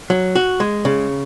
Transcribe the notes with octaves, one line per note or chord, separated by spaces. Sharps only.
F#3
F#4
G#3
C#3